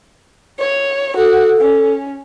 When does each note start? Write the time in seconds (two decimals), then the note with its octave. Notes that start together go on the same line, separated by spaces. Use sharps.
0.59 C#5
1.17 F#4 A4
1.61 C#4